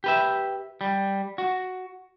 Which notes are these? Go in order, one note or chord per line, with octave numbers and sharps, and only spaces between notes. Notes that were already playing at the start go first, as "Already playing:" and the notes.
G4 B4 E5
G3
F#4